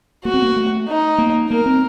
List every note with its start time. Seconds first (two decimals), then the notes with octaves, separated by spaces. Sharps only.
0.24 A#3 F#4
0.34 C4
0.42 A#3
0.56 A3
0.88 D#4
1.18 A#3
1.50 A#3 A#4
1.66 C4